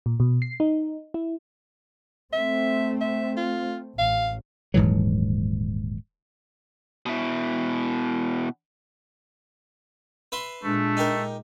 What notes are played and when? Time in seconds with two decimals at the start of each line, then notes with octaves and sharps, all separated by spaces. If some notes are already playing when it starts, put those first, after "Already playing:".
0.06 A#2
0.20 B2
0.42 C7
0.60 D#4
1.14 E4
2.33 A3 C4 E5
3.01 E5
3.37 F4
3.98 A1 F5
4.74 D#1 G#2 E3 F#3
7.06 B2 E4
10.32 B4 E5 C6
10.64 A#2 G#3 A3 D4
10.97 D#4 G4 A#4